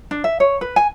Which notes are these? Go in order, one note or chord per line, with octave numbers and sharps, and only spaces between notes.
D4
E5
C#5
B4
G#5